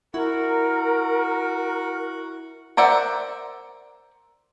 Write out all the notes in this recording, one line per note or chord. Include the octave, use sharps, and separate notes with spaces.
E4 F#4 A#4
A#4 C5 D5 E5 F#5